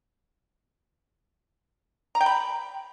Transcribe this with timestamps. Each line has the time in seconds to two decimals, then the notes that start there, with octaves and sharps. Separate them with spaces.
2.15 A#5
2.21 G5
2.26 B5